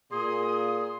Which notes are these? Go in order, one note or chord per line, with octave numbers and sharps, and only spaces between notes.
A#2 G#4 C6 D#6